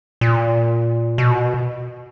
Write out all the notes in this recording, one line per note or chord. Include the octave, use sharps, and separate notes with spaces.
A#2
B2